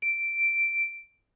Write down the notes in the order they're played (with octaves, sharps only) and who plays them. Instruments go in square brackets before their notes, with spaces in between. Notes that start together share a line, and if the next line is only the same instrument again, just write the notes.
[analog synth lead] D7